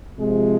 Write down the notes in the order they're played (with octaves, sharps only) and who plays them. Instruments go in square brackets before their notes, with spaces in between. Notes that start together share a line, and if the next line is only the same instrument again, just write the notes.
[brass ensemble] C3 F3 G#3